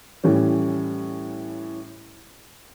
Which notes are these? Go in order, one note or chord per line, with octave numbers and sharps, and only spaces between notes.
A2 E3 G3 C#4